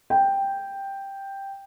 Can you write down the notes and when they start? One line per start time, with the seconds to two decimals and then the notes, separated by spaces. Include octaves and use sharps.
0.10 G5